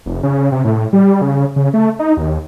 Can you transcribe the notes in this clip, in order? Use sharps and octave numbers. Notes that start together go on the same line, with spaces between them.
F1
C#3
C3
A2
G3
C#3
C#3
A3
D#4
D#2